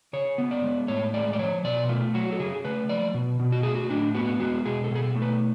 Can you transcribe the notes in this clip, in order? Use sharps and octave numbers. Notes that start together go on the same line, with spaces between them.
C#3 C#5
B3
D5
G#3
A2 C#5
G#3 D5
D5
F3 C#5
B2 D5
A3 F4
F#3 F#4
A4
C#3 G#4
A3 B4
F3 D5
B2
B2
F#4
A3 G#4
F#4
A2 D4
B3 F#4
G#3 F#4
B2 G#4
A4
B2 G#4
A4
A3
B4